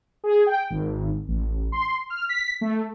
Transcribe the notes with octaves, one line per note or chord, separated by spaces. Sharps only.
G#4
G5
G#1
A1
C6
F6
B6
A3